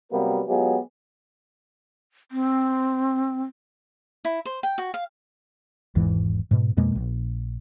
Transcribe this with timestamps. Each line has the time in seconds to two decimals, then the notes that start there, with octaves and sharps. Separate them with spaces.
0.11 C3 F#3 G3 A#3 B3 A#4
0.47 F#3 G#3 B3 F4 G4 G#4
2.32 C4
4.25 E4
4.45 C5
4.63 G5
4.78 F#4
4.94 F5
5.95 G#1 E2 G#2 E3
6.51 G#2 B2
6.77 F2 B2 G#3 A#3
6.95 A#1